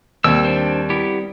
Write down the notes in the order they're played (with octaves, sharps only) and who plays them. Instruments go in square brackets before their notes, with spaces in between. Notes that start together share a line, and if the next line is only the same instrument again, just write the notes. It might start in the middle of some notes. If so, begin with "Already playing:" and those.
[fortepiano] D#2 [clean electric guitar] G3 C4 [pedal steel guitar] E6
[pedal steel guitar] D4 C5
B3 E4 G4